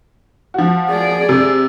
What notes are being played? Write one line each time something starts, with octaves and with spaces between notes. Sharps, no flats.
F3 F#4
G#4 D5
C3